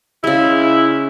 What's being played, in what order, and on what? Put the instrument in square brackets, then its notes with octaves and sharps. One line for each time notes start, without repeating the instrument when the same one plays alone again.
[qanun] C#3 G#3 [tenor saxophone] E4